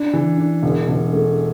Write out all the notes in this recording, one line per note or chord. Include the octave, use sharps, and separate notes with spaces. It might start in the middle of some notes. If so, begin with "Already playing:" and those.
Already playing: D4
E3
D4
E1
E1
A3